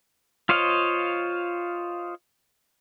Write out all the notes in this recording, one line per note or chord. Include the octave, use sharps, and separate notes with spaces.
F4 C5 C#5 D#5 F5